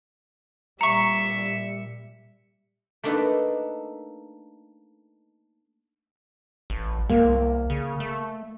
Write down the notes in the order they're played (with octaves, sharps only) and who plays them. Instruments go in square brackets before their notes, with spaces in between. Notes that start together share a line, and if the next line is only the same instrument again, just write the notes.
[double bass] A#2 G3 [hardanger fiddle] E5 [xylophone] A#5 C#6 [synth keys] C#7
[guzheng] A3 A#3 D4 D#4 A4 B4
[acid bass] A1
[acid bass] C2 [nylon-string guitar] A#3
[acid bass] C#3
A3